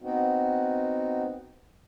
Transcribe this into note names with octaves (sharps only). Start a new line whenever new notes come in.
B3 C4 D#4 F#4